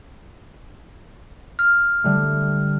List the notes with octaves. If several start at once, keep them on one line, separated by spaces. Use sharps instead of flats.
F6
D3 G3 A3